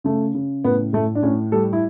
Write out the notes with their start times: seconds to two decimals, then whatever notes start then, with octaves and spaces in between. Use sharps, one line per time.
0.04 C#3 A3
0.34 C#3
0.64 A2 B3
0.93 A2 A3
1.15 D4
1.23 A2 C#4
1.52 G3 A4
1.73 E4